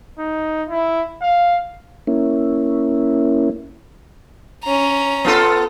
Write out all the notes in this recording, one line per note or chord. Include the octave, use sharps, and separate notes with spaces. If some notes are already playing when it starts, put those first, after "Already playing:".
D#4
E4
F5
A#3 C#4 E4
C#4 A#5
B3 F4 A4